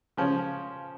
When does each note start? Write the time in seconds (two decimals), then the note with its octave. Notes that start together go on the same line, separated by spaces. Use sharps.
0.17 C#3 F3 C#4